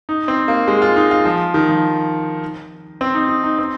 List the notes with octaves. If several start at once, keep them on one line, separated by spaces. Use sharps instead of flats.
D#4
C4
A#3
G#3
F4
D#4
F4
F3
D#3
F3
C4
D#4
D#4
D#4
C4